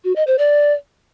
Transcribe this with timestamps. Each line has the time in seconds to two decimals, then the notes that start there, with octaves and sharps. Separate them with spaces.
0.04 F#4
0.16 D#5
0.27 C5
0.38 D5